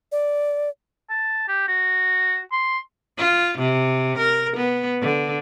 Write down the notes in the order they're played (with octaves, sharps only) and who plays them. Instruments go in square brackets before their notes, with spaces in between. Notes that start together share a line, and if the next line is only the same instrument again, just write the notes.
[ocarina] D5
[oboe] A5
G4
F#4
C6
[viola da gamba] F4
C3
A#4
B3
D3